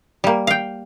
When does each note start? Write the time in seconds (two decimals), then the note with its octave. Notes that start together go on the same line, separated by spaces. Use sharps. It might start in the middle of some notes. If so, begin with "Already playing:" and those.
0.24 G3 A#3
0.47 F5 G5